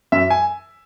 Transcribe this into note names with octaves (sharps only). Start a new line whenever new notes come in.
F#2 E5
G#5